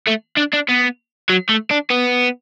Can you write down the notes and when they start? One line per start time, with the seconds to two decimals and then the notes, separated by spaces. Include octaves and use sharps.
0.08 A3
0.37 D4
0.54 D4
0.69 B3
1.29 F#3
1.49 A3
1.71 D4
1.90 B3